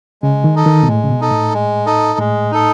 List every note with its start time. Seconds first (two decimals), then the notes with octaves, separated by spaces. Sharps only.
0.22 C#3 G#3
0.44 D#3
0.55 D#4 A4 D#5
0.66 D#3
0.83 B2
0.88 A2 G#3
1.04 C#3
1.09 B2
1.21 D#4 A4 D#5
1.31 A2
1.54 G#3
1.86 D#4 A4 D#5
2.19 A2 G#3
2.51 D#4 A4 D#5